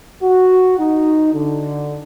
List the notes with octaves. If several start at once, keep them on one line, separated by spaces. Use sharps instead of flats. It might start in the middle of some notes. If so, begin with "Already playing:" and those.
F#4
D#4
D3